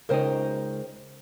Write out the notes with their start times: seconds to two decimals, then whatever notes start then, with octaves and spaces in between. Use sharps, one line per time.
0.09 C#2 C#3 D#4 A#4 C5 G5